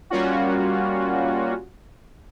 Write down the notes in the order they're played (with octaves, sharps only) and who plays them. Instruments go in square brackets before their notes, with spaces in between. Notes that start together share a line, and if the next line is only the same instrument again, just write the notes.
[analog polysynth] G3 A#3 C#4 F4 F#4